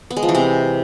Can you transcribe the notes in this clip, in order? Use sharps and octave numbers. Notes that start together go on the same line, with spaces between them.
B3
G#3
F3
E3
C3